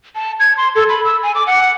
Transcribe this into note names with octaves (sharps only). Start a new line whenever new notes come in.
A5
G#6
C6
A4
B5
E6
G#5
D6
F#5